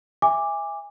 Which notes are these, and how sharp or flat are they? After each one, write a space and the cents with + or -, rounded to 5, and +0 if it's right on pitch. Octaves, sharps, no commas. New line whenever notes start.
E5 +0 G#5 -25 D6 +0